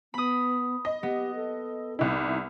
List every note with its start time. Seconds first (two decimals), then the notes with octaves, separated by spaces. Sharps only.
0.14 B3 B5 D#6
0.85 D#5
1.03 B3 G4
1.35 A4
1.99 C2 D#4 E4